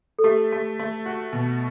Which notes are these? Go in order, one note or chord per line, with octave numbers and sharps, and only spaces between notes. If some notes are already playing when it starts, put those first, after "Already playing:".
A4
A3 G4
A3
A3
F#4
B2